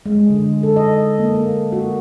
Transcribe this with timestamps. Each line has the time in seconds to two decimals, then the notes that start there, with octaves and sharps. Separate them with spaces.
0.06 G#3
0.30 D3
0.63 A4
0.76 D#5
1.19 A#3
1.35 A#3
1.72 F#4